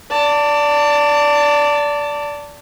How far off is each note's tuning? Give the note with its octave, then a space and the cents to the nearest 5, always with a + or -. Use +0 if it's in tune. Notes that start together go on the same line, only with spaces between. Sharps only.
D5 -15 A5 +25